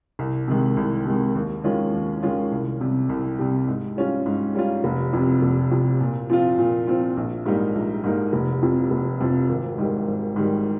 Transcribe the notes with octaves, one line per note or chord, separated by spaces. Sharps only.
C2
C3 D#3 G#3
C2
C3 D#3 G#3
D#2
D#3 G#3 C#4 F4
D#2
D#3 G#3 C#4 F4
C2
C3 G3
C2
C3 G3
G#2
G3 C#4 F4
G#2
G3 C#4 F4
F1
F2 C3
F1
F2 C3
A#2
F3 C4 F4
A#2
F3 C4 F4
A#1
G#2 G3 A#3 D#4
A#1
G#2 G3 A#3 D#4
F1
F2 C3 F3
F1
F2 C3 F3
G#1
G#2 D#3 G3
G#1
G#2 D#3 G3